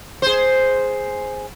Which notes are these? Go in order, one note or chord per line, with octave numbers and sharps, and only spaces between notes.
G#4 C5